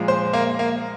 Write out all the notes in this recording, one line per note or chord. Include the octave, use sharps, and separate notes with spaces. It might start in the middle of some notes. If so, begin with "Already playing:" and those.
Already playing: A#2 F3 G#3
C5
A#3
A#3